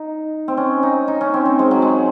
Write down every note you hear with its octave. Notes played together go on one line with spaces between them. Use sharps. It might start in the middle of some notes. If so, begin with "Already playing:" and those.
Already playing: D#4
C4
C#4
D#4
D#4
C#4
C4
C4
G#3
F#3
G#3